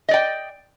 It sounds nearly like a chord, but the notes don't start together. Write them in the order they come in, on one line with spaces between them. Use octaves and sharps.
D#5 D5 G5